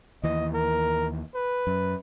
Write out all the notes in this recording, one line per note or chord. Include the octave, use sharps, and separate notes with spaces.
D#2 E3 D#5
A#4
B4
F#2